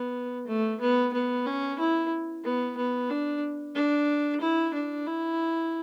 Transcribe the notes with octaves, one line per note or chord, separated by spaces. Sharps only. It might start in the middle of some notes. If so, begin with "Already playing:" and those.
Already playing: B3
A3
B3
B3
C#4
E4
B3
B3
D4
D4
E4
D4
E4